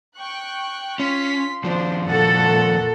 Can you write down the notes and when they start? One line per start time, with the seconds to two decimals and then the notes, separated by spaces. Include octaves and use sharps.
0.16 G5 C#6 F#6
1.00 C#4 F4 C6 B6
1.64 D#2 F3 D4 C5
2.07 A#2 F#4 A4 F#5